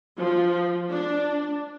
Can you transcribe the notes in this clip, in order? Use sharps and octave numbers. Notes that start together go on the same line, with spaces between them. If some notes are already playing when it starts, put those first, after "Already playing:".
F3
D4